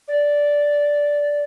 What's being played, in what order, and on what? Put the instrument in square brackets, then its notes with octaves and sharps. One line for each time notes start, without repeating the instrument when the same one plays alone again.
[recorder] D5